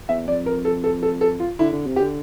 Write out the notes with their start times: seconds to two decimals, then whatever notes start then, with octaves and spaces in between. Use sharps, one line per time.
0.09 E2 E5
0.28 F2 D5
0.46 A#4
0.65 A4
0.84 A4
1.03 A4
1.21 A4
1.40 F4
1.59 D3 E4
1.73 D3
1.87 C3
1.96 G4
2.01 D3